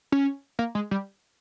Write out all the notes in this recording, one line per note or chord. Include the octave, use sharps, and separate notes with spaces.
C#4
A#3
G#3
G3